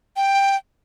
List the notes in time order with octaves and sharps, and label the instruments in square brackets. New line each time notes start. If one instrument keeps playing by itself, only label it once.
[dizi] G5